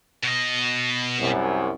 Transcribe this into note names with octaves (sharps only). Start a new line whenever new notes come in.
B2 D#5
C2 F#2